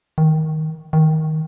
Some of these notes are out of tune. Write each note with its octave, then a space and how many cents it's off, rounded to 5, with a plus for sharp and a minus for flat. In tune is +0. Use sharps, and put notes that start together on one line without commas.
D#3 +10
D#3 +10